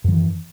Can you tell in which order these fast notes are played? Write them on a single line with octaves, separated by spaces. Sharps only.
F#2 F3 E3